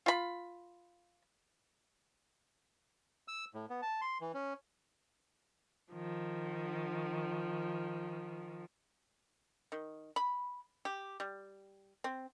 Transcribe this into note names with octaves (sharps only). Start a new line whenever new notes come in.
F4 B5
E6
A2
B3
A5
C6
E3
C#4
D#3 F3
D#3
B5
G4
G3
C4